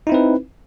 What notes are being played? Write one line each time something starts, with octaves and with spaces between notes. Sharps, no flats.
C4 D#4 E4 B4